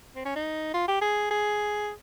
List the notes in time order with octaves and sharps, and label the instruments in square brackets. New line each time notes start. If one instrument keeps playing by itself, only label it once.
[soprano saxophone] C4
C#4
D#4
F4
G4
G#4
G#4